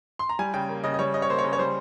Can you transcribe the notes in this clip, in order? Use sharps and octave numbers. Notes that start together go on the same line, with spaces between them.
C6
A#5
G3 G#5
C#3 G5
A#3
C#3 D#5
D#5
G3 C#5
C#3 D#5
C#5
A#3 C5
C#5
C#3
C#5
G3 C5